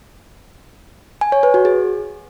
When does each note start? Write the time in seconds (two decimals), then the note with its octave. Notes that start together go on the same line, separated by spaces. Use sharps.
1.21 G#5
1.32 C#5
1.43 B4
1.54 F#4
1.65 G#4